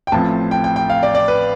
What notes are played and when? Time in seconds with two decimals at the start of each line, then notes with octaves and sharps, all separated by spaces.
0.07 G5
0.12 A1 A2 F3 C4 A5
0.51 G5
0.64 G5
0.76 G5
0.90 F5
1.03 D5
1.15 D5
1.28 B4